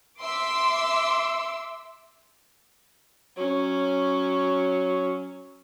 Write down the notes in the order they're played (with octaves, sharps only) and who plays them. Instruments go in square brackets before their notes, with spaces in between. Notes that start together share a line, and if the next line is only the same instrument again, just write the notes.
[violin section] E5 C6 D6 E6
[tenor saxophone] F#3 [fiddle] C#4